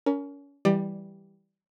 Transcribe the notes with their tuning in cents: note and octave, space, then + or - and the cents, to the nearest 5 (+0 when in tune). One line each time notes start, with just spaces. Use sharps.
C#4 +30 A#4 +0
E3 +0 G3 +0 D5 +25